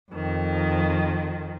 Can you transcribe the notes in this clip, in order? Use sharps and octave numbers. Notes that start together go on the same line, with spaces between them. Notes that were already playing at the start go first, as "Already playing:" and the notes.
F2 D#3